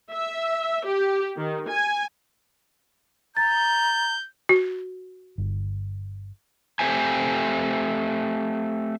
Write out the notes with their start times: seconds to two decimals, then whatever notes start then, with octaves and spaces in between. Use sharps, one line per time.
0.11 E5
0.85 G4
1.37 D#3
1.69 G#5
3.37 A#5 G6 A6
4.49 F#4
5.38 G1
6.79 A3 C4 G4 C5 E5 G#5